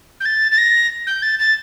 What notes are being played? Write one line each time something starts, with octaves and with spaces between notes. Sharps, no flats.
G6
A6
A6
A#6
G6
A6
A6